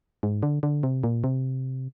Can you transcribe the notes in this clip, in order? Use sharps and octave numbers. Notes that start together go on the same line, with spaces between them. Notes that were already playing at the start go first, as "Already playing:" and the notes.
G#2
D3
D3
C3
A#2
C3